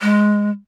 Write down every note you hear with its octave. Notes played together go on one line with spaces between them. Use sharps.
G#3